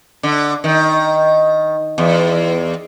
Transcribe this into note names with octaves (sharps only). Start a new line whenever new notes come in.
D3
D#3
E2